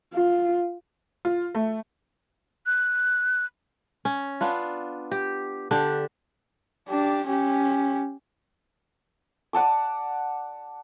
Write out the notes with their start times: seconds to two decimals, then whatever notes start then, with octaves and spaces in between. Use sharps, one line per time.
0.14 F4
1.25 F4
1.55 A3
2.66 F#6
4.05 C#4
4.41 B3 D4 F4
5.11 G4
5.71 D3 D4 G4
6.89 D4 G4
7.26 C#4 G4
9.53 D5 F#5 A5 D6